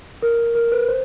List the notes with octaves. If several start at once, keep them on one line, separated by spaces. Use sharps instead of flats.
A#4
A#4
B4
C5